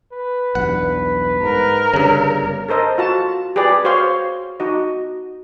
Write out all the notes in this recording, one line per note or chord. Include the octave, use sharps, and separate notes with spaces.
B4
B1 E2 G2 F#5
G#2 A#4
G1 G2 C#3
A4 A#4 C5 D#5
F4 F#4 A5
G4 G#4 B4 D5
F#4 C5 C#5 F5 C6
D#4 F#4 D#5